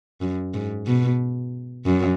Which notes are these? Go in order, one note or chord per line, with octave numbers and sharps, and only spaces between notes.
F#2
G#2
B2
F#2